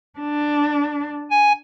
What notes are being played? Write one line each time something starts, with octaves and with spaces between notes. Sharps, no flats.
D4
G#5